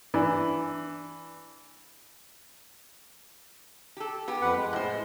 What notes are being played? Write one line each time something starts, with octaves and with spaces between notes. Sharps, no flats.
E3 D4
G4 A4
B3 G4
F2 B4 F#5
G#3
A2 C5